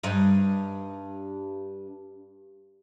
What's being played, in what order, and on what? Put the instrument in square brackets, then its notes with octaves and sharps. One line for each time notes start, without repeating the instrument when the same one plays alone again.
[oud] G2 D#4